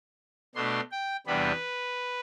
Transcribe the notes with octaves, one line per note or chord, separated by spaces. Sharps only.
B2 A3 D4 C6
G5
E2 C3 G3 B3 D4 B4